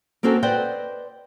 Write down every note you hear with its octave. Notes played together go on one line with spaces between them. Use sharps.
A#3 C4 C#4 F#4 A4
B4 C5 D5 D#5 F#5 G5